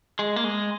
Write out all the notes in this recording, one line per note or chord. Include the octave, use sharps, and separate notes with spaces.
G#3
A#3
G#3